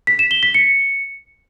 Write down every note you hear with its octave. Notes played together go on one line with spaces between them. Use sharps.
B6
E7
G7
B6
C#7